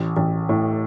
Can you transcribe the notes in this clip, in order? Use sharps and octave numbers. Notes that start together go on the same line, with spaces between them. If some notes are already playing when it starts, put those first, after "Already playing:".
Already playing: A1
A1
A2